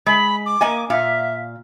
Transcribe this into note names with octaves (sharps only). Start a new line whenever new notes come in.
G#3 B5
D6
A#3 D#5 G#5
A#2 E5 F5